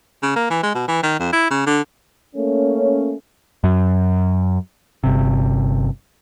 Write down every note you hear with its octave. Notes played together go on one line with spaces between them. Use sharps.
C#3
A#3
E3
G#3
B2
E3
D#3
F2
E4
C#3
D3
A3 A#3 C#4
F#2
G1 C3